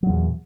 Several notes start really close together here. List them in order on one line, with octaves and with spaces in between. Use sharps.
F#3 A#2 E2